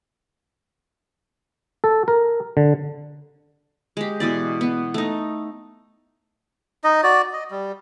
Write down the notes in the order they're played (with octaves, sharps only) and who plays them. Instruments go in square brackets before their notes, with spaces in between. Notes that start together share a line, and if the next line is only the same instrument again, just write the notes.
[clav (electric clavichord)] A4
A#4
D3
[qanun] G#3 G4
B2 E3 D5
B3
A3 D#4
[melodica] D#4 D#5
F#4 D5
D#5
G3